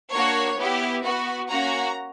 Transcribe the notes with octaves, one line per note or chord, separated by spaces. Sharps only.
A#3 D4 F#4 C#5
B3 E4 G4
B3 F#4
A#3 C#4 F#4 A#5